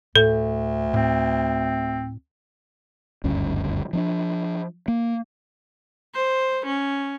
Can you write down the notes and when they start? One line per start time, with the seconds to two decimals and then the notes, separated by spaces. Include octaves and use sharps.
0.16 D2 A2 A4
0.94 A2 C4
3.24 F#1 D2 G2 C#4
3.93 F3 C#4 D4
4.88 A#3
6.14 C5
6.66 C#4